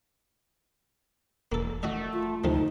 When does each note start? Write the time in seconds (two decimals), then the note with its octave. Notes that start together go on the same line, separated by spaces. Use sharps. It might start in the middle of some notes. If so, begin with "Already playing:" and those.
1.52 E1 A#3 A4
1.83 A3 F#4 D#5 E5
2.13 F4
2.44 D2 C3 F3 A3 D#4